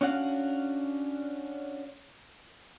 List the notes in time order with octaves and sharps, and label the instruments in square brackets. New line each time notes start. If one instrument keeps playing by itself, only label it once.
[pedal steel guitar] C#4 D4 F#4 F5 F#5